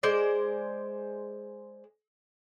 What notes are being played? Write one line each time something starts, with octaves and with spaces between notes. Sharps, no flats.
G#3 C5 D5